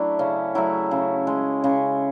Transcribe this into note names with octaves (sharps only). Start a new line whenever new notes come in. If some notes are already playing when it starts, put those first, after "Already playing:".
Already playing: F#3 A3 D4 E4
C#3 C#4
F#3 A3 E4
C#3
G#3
C#3